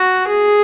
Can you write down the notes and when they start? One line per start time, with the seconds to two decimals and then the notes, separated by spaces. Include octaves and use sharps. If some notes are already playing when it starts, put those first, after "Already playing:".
Already playing: F#4
0.27 G#4